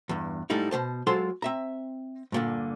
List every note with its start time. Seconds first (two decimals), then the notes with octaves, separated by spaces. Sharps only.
0.09 E2 G2
0.50 G#2 G3 A3 D#4 E4
0.71 B2 F#3 C5 A5
1.07 F#3 G#3 F4 A4 C5 C6
1.42 C4 E5 A#5
2.32 G2 A#2 D3